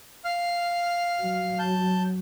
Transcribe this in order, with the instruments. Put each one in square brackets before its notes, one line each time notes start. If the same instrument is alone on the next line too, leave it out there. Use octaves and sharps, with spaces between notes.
[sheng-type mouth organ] F5 F6
[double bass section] F#3
[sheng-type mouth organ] A5 G6